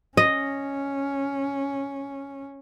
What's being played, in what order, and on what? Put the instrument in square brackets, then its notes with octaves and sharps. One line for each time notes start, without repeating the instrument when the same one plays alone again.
[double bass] C#4 [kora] D#5